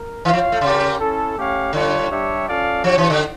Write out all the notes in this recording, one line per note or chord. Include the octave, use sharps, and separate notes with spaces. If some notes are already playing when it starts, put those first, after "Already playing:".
Already playing: A#4
E3 F4 C#5 F5
F3
A3
C#3 C#4 G4 A#4
C#4 E4 A4
A3 C#4 G4 C#5 F5
D3 G3 D4 F4 C#5
G3 D4 G4 C#5 E5
C#4 F4 A4 D5 F5
F3 D4 G4 C#5
E3
D3